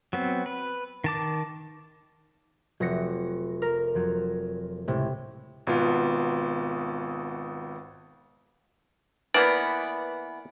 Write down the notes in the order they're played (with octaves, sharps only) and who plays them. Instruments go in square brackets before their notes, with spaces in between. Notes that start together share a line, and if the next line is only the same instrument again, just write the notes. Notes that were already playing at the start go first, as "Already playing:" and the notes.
[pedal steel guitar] F#3 B3 C4
B4
D#3 A5 D6
[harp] F1 A#6 C#7 [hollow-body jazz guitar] F#3
[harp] A#4
[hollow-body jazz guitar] F2 F3 F#3
[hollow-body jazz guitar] C#2 A2 [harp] C3
[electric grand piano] G#1 B2 B3 F4
[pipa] E3 B3 [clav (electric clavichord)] A#3 D5